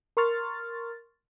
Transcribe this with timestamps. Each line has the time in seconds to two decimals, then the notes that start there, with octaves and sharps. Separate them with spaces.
0.17 A#4 C6 C#6 F6 A6